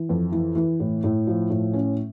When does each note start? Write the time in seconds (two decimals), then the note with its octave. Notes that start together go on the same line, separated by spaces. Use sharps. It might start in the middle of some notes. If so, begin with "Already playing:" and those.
Already playing: E3
0.09 F2
0.32 E3
0.55 E3
0.80 A2
1.04 A2
1.27 F3
1.50 A2
1.73 C#4